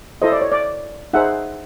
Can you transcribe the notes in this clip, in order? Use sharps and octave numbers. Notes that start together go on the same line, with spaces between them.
E4 A4 C5 D#5
D5
C#5
D5
D#4 G#4 C5 E5 F#5